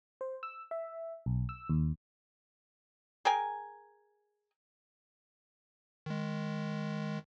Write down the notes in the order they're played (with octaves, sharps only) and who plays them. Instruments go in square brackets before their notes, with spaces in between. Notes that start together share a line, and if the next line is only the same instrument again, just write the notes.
[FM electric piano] C5
E6
E5
B1
E6
D#2
[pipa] G#4 A#4 G5 G#5
[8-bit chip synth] D#3 G#3